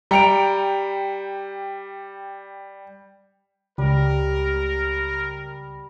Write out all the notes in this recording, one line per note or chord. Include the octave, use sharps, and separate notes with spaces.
G3 G5 A#5 C#7 D7 F7
C#2 G3 A#4